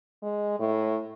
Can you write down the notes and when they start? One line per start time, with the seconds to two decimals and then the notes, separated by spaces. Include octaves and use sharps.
0.23 G#3
0.59 A2